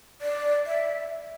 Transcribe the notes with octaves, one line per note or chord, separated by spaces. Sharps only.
D5
E5